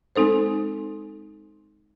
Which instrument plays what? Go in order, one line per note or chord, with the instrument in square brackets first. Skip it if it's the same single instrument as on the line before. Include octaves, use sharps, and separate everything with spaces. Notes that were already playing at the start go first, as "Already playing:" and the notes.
[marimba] G#3 C4 D#4 A4 C5